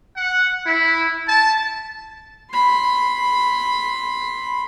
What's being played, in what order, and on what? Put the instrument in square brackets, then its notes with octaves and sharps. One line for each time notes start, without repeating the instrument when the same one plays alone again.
[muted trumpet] F#5
E4
A5
[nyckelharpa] B5 C6